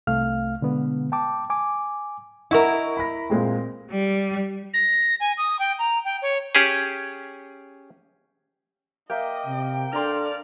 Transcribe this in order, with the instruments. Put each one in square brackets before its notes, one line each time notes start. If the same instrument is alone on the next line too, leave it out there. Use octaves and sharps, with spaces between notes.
[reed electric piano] C2 A3 F5 F6
B2 D3 G#3 B3
G5 A5 D6
G#5 D6
[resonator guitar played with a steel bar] E4 A#4 [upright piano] D#5 F#5 C#6
[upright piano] B5 A#6
A#2 G#3 C4
[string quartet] G3
[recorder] A#6
G#5
D#6
G5
A#5
G5
C#5
[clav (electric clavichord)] C#4 G4 G#4
[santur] A#3 E5 [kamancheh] D#5 [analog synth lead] G5
[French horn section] C3
[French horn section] D4 A4 [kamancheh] D5 F6 [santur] A#5 C6